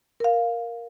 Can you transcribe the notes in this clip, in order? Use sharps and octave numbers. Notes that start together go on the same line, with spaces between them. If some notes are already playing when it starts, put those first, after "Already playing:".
A#4 F5